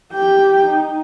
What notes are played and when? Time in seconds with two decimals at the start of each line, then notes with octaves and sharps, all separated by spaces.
0.12 G4 G5
0.66 D#4